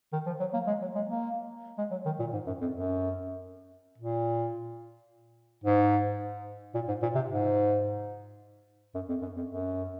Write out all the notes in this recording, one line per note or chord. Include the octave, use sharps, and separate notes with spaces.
D#3
F3
F#3
A#3
G#3
F#3
G#3
A#3
G#3
F#3
D#3
A#2
G#2
F#2
F2
F#2
A#2
G#2
A#2
G#2
A#2
C3
G#2
F#2
F2
F#2
F2
F#2